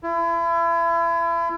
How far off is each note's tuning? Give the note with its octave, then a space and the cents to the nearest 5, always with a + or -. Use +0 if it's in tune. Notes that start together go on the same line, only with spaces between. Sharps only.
E4 +35